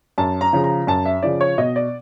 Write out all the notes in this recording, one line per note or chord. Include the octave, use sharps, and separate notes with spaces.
F#2 A5
A#5
C#3 F3
A#5
F#2 A5
E5
C#3 F3 D5
C#5
B2 D#5
D5